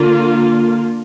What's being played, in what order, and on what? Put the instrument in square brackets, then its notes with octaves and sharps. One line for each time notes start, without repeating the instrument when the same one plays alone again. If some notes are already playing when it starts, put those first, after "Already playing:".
Already playing: [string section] D3 A#3 F4